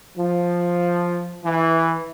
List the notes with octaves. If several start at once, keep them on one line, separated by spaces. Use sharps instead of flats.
F3
E3